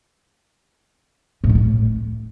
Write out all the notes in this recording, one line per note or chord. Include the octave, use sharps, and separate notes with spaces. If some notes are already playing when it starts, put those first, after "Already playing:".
A2
D#3
A2